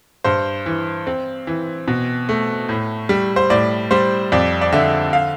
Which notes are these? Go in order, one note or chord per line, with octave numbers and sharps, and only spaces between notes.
G2 C5
E3
C4
E3
B2
A3
A2
G3
C5
A2 D5
G3 C5
F2 D5
D5
D3 E5
F5